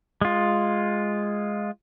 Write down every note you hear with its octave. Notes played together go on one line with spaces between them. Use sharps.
G#3 F4